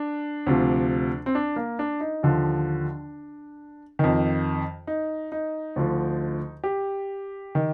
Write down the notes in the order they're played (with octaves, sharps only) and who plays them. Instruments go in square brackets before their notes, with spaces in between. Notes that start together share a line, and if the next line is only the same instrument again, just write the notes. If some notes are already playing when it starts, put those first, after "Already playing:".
Already playing: [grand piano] D4
D2 C3 F3
C4
D4
A#3
D4
D#4
D#2 D3 F3 D4
F2 D#3
D#4
D#4
D2 D3 F3
G4
D#3